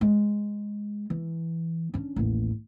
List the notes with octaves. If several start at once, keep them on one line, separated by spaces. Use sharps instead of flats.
G#3
E3
C#4 D4
A1 D#2